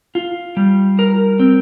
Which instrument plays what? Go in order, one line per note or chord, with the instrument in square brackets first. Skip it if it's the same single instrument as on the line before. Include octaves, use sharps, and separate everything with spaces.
[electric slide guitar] F4
G3
A#4
C4